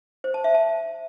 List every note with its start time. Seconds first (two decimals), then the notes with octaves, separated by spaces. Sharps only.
0.24 C5
0.34 A5
0.44 E5
0.54 A5